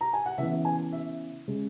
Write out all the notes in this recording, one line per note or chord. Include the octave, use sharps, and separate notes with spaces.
A#5
G#5
F#5
C#3 E3 B3 E5
G#5
E5
C#3 G#3